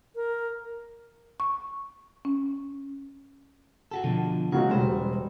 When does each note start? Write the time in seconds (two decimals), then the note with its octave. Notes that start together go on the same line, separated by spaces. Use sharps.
0.16 A#4
1.40 C#6
2.25 C#4
3.91 F#4 G4 A4
4.04 B2 D3 F3
4.52 C#3 F#3 G#3 F#4
4.71 E1 G3 C5